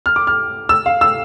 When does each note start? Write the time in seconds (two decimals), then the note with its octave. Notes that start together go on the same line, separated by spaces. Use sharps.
0.06 F6
0.16 D6
0.27 F6
0.69 E6
0.86 F5
1.01 E6